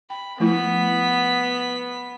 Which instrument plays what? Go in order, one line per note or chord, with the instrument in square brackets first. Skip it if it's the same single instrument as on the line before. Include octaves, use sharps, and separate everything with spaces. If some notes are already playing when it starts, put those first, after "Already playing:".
[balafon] G5 [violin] B5
[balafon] F3 A3 E4 [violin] B3 B6